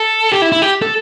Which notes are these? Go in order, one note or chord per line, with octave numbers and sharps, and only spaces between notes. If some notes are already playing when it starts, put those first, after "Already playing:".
Already playing: A4
G4
E4
E4
G4
A4